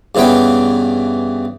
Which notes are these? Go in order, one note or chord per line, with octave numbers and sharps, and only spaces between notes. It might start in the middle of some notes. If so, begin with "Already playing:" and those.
G2 C#3 E3 B3 G5